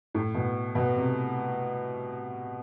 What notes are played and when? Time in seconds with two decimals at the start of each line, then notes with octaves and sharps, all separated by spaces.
0.15 A2
0.34 B2
0.75 B2
0.96 C3